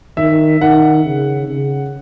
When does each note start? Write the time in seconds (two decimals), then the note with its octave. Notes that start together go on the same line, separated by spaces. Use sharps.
0.17 D#3 E5
0.61 D#3 F#5
1.05 C#3
1.49 C#3